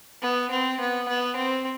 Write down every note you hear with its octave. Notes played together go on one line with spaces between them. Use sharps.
B3
C4
B3
B3
C4